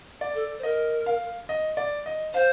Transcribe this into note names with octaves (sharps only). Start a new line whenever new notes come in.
D5
A4
C5
A#4 D#5
F5
D#5
D5
D#5
C5 F5